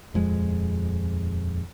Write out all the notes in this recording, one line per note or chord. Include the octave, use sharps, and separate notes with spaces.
D#1 F2 G#3